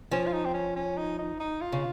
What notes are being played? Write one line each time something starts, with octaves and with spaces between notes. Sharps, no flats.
F3 C#4
F4
D#4
C4
C#4
C#4
D#4
D#4
D#4
F4
C#3